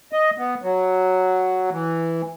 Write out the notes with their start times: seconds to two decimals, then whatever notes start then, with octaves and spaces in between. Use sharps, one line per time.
0.12 D#5
0.38 B3
0.62 F#3
1.71 E3